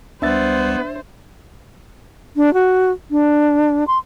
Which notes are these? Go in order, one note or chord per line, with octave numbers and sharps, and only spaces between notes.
C#2 G3 B3 D4 C5 E5 A6
D4
F#4
D4
C6